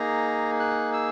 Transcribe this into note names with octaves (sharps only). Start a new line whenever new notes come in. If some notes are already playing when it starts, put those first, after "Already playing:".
Already playing: A#3 D#4 G#4 A#5
F#6
E6